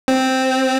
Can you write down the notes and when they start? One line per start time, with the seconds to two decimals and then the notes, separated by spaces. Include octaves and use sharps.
0.08 C4